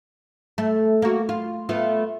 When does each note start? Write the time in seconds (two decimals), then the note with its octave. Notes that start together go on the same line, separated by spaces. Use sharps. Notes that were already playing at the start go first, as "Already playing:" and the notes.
0.58 A3
1.02 A#3 F#4
1.29 F4
1.69 A3 B3 F4